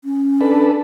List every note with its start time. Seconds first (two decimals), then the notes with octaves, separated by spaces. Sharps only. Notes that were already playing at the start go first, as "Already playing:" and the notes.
0.04 C#4
0.41 D4 A4 B4